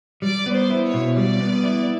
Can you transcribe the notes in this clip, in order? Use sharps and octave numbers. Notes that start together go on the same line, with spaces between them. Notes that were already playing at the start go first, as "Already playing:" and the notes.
G3 D5
B3
C5
E4
C#5
B2
G3 D5
B3
E4